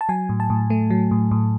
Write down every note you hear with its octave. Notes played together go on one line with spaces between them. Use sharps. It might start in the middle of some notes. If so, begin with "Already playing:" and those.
A5
F#3 G#5
A2
A5
A2
A3
F#3
A2
A2